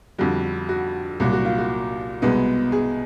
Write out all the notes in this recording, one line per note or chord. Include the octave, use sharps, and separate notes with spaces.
F2 D3 G3 F#4
F#4
C2 A#2 F#3 F#4
F#4
F4
F#4
C2 B2 G#3 B3
G#4